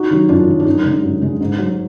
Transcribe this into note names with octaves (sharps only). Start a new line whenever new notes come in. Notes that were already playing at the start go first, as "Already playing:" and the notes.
Already playing: D#4 F#4
D#3 F#3
F#2 D4 F4
D#3 F#3
D4
F#2 D#4
D3 G#3
F#2
D3 G#3
G#2
F#3